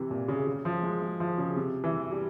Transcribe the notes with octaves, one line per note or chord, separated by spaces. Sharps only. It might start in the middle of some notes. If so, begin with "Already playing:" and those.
Already playing: C3 E3
A#2
C#3
C#3
F3
G#3
G#3
F3
C#3
C3
E3
G3